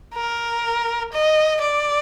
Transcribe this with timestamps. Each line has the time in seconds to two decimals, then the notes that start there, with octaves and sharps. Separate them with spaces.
0.15 A#4
1.13 D#5
1.61 D5